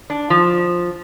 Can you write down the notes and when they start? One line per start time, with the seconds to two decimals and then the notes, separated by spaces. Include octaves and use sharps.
0.10 D4
0.30 F3